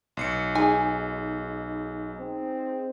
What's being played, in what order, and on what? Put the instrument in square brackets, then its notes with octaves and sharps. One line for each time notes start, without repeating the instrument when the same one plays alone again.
[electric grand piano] B1 C7 C#7
[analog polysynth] D#4 G#4 [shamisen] G#5
[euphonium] C4